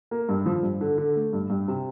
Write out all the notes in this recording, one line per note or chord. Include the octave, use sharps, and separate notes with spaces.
A#3
G2
F3
G2
D3
D3
A3
G2
G2
C3